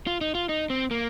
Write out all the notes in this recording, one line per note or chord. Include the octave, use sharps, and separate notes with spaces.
F4
D#4
F4
D#4
C4
A#3